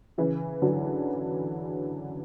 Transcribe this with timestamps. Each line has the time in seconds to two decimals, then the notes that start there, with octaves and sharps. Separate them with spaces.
0.18 C#3 E3
0.62 D3 F#3